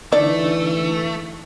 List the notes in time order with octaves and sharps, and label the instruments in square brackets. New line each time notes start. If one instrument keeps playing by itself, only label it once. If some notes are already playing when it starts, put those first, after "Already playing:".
[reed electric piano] D3 D4 D#4 [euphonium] E3 [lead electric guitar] A3 [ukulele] D5